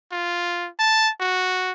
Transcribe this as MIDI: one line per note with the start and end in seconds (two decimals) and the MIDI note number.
0.12 0.68 65
0.79 1.10 81
1.20 1.72 66